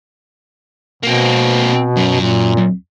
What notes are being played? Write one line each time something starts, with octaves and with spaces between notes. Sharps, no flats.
B2 A#3 C4
F#2
A#2